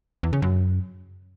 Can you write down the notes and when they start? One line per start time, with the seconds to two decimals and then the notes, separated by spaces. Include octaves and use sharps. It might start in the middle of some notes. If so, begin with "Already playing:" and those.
0.23 E2
0.33 C#3
0.42 F#2